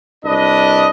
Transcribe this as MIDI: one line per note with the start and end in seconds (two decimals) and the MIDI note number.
0.24 0.89 36
0.24 0.89 62
0.24 0.89 71
0.24 0.89 75